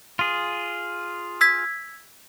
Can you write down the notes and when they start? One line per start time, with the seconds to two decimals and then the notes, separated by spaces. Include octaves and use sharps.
0.19 F4 G#4
1.41 E6 G#6 B6